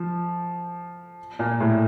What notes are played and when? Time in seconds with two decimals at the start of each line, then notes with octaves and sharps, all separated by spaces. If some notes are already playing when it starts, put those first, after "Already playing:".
Already playing: F3
1.39 A#2
1.60 A2